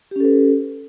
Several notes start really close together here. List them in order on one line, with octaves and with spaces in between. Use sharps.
G4 C#4 A4 B4